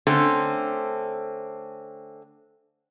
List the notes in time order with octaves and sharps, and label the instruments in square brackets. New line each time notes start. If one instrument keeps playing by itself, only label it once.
[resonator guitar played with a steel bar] D3 A3 C4 C#4